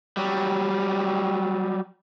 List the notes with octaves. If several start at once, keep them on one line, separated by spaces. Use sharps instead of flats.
F#3 G3